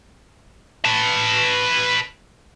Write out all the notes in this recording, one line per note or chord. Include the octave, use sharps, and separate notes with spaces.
B4 A5